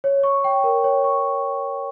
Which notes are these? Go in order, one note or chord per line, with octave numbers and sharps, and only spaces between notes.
C#5
C#6
G5
A#4
C#5
C#6